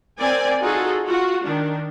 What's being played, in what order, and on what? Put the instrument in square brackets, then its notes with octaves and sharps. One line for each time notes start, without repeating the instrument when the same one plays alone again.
[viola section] C4 A#4 D5 G#5
D#4 F4 F#4 G#4 A4
F4 F#4
D#3 D4